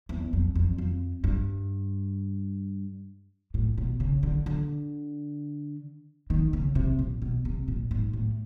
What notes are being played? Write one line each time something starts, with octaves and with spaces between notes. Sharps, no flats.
E2
F2
F2
F2
G2
A2
B2
C#3
D3
D3
D#3
C#3
C3
A#2
B2
C3
A#2
G#2
A2